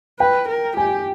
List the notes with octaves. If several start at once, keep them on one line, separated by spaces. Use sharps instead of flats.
B4 G5
A#4
G4 G#5